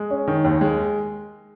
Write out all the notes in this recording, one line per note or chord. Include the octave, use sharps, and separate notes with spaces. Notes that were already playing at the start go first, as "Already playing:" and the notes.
Already playing: G#3
C#4
D#3
D#2
G#3